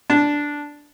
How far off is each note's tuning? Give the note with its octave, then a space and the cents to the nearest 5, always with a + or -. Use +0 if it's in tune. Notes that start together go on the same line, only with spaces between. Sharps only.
D4 -5